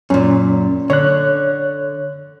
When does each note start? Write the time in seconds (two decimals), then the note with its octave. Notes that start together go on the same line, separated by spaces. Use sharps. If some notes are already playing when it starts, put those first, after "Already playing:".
0.10 F#2 A#2 C#4
0.90 D3 C#5 F#6